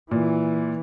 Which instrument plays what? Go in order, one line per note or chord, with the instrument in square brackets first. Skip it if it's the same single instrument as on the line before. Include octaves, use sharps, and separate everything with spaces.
[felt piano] A#2 [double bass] E3